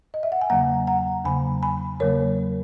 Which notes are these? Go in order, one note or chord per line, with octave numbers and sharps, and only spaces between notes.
D#5
E5
F#5
G#5
E2 C#3 F#3 A#3 F#5 A#5
F#5 A#5
E2 C#3 F#3 A#3 G#5 B5
G#5 B5
E2 C#3 F#3 A#3 A#4 C#5